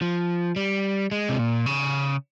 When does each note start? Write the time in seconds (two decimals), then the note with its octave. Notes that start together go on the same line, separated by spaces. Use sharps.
0.02 F3
0.56 G3
1.11 G#3
1.29 C3
1.39 A#2
1.66 C#3